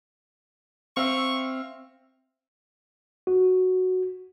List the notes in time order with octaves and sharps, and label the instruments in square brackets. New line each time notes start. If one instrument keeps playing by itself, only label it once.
[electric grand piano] C4 [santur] E5 F5 [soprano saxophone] C#6
[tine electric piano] F#4